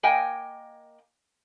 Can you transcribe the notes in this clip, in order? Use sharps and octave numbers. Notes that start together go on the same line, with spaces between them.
A#3 D#5 G5 G#5